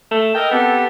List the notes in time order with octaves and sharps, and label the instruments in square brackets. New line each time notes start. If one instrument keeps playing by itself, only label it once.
[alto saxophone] A3
[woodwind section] A4 A#4 D#5 [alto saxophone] G5
[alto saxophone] B3 [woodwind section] C4 G4 A4